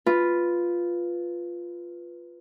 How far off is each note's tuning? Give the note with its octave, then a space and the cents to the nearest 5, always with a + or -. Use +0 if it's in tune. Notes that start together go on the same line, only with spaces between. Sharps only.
F4 +0 B4 +0